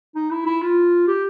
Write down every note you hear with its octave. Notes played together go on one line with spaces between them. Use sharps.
D#4
E4
E4
F4
G4